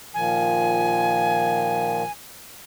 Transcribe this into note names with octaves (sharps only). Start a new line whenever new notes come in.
A#2 D#3 F3 G#5